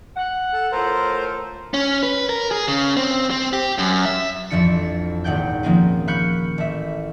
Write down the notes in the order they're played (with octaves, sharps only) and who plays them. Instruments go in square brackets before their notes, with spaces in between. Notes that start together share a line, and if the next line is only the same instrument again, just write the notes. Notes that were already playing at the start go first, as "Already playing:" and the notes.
[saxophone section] F#5
[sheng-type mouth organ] A4
[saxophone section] A2 F4 A4 [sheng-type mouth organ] A#4 C5
[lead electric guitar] C#4
B4
A#4
G#4
C#3
C4
C4
G4
F#2
E5
[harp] A1 F2 E3 F3 D4 C#7
D#1 G#1 F#5 G5 G6
D#3 F3 A#3 C4 C#4
F5 B5 C#6 F#6 G6 C#7
A1 E5